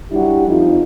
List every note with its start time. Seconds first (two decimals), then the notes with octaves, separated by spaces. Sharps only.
0.12 F#3 G3 D4 E4 F#4 G4
0.48 F2 F3 D#4